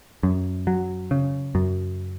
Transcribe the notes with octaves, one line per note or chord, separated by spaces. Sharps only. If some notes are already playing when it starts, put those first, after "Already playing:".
F#2
F#3
C#3
F#2